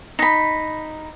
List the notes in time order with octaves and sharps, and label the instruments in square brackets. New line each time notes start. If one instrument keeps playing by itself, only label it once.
[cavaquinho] D#4 B5